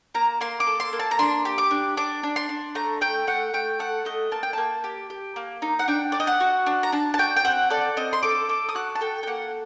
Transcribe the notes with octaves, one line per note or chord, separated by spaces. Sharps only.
A#3 A#5
A#3 C6
D6
A4
C6
A#3
A5
A#5
D4 C6
G4
D6
D4
D4 D6
D4
C6
D4
A3 A#5
A3 G5
A3 F#5
A3 G5
A4 F#5
A3 D#5
A#3 A5
G5
A#3 A5
G4
G4
A#3
D#4
F#5
D4 G5
D4 D5
D#5
F#5
F#4
D4
A#5
D4 A5
A5
F#4 G5
G5
C4 F#5
A4 D5
C4 D#5
C6
A4 D6
A4 D6
D#6
F#4 F#6
A5
A4 G5
G5
A#3 F#5